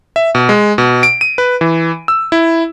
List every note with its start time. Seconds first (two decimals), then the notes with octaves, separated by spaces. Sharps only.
0.16 E5
0.35 B2
0.49 G#3
0.78 B2
1.03 D7
1.21 D#7
1.38 B4
1.61 E3
2.08 E6
2.32 E4